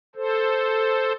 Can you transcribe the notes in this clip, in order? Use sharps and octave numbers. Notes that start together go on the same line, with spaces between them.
A4 C5